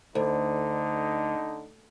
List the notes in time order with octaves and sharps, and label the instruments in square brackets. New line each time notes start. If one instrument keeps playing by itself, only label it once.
[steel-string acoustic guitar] D2 [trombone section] D3 D#4